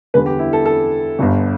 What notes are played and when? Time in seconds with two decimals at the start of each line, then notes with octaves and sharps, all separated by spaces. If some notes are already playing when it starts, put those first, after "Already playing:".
0.14 E2 D3 G3 B4
0.26 G4
0.39 E4
0.53 A4
0.65 A4
1.19 G1 G2 D3